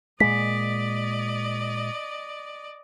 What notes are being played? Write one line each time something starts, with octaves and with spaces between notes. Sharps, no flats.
A#2 G#3 D5 D#5 B6